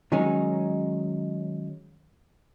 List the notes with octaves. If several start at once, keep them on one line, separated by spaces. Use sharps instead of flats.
D#3 F#3 G#3 C#4 D#4